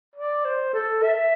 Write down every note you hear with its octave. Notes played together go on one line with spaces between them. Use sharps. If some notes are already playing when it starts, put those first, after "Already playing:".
D5
C5
A4
E5